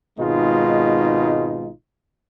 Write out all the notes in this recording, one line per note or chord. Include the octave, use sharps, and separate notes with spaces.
G#1 B2 G#3 D#4 F4